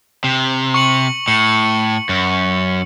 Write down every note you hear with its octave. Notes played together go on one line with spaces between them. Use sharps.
C3
C#6 C#7 F#7
A2 C#7
F#2